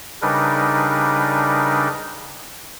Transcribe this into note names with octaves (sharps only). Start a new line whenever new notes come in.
C#3 G3 D4 D#4 A#4 B4